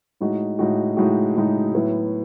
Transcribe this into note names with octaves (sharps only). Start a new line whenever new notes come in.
A2 G#3 D#4 F#4
A2 G#3 D#4 F#4
A2 G#3 D#4 F#4
A2 G#3 D#4 F#4
A2 F#3 B3 E4